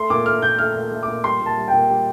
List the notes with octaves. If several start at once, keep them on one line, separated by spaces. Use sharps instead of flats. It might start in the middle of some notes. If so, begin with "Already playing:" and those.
Already playing: A3 C6
A#2 D6
A3 F6
A#2 G6
A3 F6
A#2
A3
D6
A#2
G3 C6
A#2
A5
G3
G5
A#2
G3